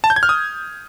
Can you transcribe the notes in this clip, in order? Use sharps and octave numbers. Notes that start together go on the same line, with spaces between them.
A5
G6
G#6
F6
D#6